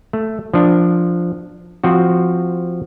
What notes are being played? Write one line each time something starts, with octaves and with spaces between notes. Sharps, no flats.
A3
F3 D4
F3 C4 F#4